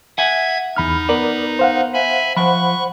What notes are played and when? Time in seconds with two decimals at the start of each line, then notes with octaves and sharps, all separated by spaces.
0.18 E5 F#5 G#5 G#6
0.76 E2 D#4 B5 F6
1.09 B3 A#4 D5
1.59 C5 F5 F#5
1.94 E5 G#5 B5
2.37 F3 C5 F#5 B5 C#6 F#6